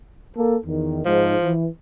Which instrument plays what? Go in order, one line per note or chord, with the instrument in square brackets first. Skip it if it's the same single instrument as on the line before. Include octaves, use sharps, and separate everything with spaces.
[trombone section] A#3 A4
E2 D#3
[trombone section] G#2 [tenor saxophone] F3
[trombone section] E3